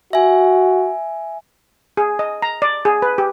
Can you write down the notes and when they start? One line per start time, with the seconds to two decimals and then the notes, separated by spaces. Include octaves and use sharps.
0.13 F#4 E5 G#5
1.97 G#4
2.19 D#5
2.42 A#5
2.62 D5
2.85 G#4
3.02 B4
3.18 G4